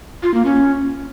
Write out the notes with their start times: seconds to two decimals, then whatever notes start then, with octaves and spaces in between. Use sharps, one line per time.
0.23 F4
0.34 A#3
0.45 C#4